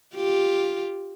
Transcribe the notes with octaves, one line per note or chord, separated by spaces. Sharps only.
F4 G4